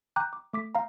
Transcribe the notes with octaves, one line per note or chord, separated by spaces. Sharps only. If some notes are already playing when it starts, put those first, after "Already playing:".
G5 A#5 D6 F#6 G6
D6
A3 D6 B6
F5 A#5